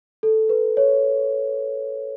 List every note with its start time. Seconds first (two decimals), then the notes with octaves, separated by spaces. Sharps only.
0.23 A4
0.49 B4
0.77 C#5